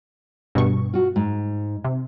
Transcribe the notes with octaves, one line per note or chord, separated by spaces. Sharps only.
G2 B2 C#6
F4 F#4
G#2
C3